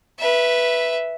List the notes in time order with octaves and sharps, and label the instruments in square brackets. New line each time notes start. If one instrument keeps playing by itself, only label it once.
[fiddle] B4 E5